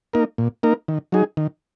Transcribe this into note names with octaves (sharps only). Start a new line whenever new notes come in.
A#3 D#4 A#4
A#2
A#3 D#4 A#4
D#3
F#3 D#4 G#4
D#3